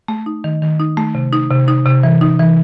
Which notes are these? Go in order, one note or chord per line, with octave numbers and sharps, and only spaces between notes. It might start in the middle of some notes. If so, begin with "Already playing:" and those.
A3
D#4
D#3
D#3
D#4
A3
C3
D#4
C3
D#4
C3
E3
D#4
E3